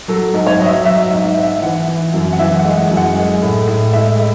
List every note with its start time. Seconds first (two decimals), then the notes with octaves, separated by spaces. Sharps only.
0.08 F#3 A4
0.34 G#2
0.47 C#5
0.60 F#3 D#5
0.66 E5
0.85 F#3 E5
1.04 E5
1.11 G#2
1.24 E5
1.37 G#2
1.43 E5
1.62 E3 F#5
1.88 E3
2.14 F#2
2.33 F#5
2.39 E3 E5
2.59 F#5
2.65 G#3
2.77 F#5
2.91 F#2
2.97 F#5
3.16 G#3
3.42 A2
3.68 A2
3.93 G#3 E5
4.19 G#3